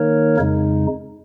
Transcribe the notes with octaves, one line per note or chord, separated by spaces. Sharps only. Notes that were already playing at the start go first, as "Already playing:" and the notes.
Already playing: D#3 A#3 D#4 A#4 C#5
F2 C#3 G#3 D#4